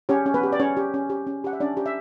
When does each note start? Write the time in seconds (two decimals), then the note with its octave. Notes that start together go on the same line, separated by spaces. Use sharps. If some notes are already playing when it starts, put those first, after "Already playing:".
0.09 C#4 G4 C#5
0.26 C#4
0.34 B3 B4
0.43 G4
0.52 D5
0.59 C#4 C#5
0.77 G4
0.94 C#4
1.10 G4
1.27 C#4
1.44 G4 F#5
1.53 E5
1.60 C#4 D4 D5
1.77 G4
1.86 E5